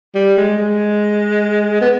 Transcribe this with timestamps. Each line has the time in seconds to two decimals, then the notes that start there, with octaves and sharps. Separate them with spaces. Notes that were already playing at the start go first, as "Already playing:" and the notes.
0.15 G3
0.37 G#3
0.58 G#3
1.81 B3